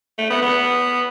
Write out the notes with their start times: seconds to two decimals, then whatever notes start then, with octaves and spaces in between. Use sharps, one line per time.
0.18 A3
0.30 B3
0.42 B3